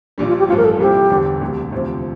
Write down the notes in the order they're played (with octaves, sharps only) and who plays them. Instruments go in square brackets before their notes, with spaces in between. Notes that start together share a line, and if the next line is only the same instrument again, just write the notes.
[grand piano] A#1 A#2 G3 [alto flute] D4
[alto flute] F4
G4
[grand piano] A1 G2 F3 [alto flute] F4
[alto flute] A#4
A4
[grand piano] C2 A#2 G3 C4 E4 [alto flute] G4
[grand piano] E1 E2 D3
E1 D2 C3
E1 D2 C3 F3 C4